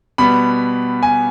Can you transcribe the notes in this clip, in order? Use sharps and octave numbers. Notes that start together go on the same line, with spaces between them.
B2 G3 B3 B5
G#5